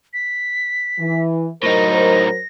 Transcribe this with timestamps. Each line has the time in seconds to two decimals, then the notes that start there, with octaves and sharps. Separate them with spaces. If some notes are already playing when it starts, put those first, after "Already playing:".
0.14 B6
1.00 E3
1.63 A2 F#3 D#4 A#4 C5 A#6